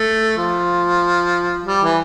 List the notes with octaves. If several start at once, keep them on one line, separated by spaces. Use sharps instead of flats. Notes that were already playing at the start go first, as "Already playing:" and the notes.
Already playing: A3
F3
G3
E3